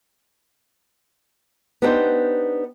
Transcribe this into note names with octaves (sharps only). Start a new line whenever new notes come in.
B3 D4 D#4 G4 C5